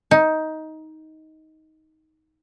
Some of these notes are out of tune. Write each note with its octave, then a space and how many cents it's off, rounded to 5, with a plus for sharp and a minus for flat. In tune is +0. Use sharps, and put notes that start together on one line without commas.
D#4 +15